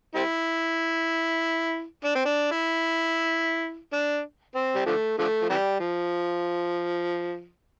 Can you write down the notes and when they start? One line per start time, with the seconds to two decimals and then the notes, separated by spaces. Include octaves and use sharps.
0.15 G3 C4 E4
2.04 D4
2.15 C4
2.25 D4
2.52 E4
3.93 D4
4.55 C4
4.75 G3
4.86 D3 F3 A3
5.18 D3 F3 A3
5.41 F3
5.50 C3 E3 G3
5.80 F3